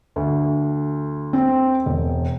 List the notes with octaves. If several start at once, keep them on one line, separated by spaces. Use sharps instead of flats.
D2
C4
E1